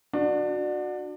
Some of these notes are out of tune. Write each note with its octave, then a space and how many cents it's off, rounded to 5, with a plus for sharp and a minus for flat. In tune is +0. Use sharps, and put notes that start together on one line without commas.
D4 +25 F#4 -20